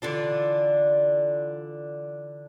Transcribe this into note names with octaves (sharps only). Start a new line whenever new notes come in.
D3 E3 D4 F4